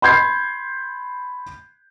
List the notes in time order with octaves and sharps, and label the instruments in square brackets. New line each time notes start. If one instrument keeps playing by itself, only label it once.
[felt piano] B5 C6 G6 G#6 C7